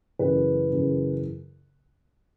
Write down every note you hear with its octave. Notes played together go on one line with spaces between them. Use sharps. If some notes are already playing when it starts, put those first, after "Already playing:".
F#2 C#3 E3 B4
F#2 C#3 E3